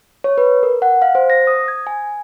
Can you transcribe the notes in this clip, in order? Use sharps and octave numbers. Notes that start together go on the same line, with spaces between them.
C#5
B4
A#4
F#5
F5
C5
A#6
D#6
G#6
G#5